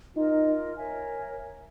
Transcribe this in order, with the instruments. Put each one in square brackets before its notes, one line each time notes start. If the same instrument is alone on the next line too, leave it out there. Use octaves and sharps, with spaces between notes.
[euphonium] D#4 [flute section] F4 A#4 D#5
[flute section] A#4 C#5 E5 G#5